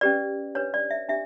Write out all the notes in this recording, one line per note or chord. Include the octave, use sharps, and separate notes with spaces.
C#4 G4 B4 D5
D4 G4 B4 C#5
D5
E5
D4 G4 E5